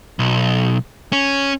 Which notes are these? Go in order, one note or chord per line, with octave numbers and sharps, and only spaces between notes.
B1
C#4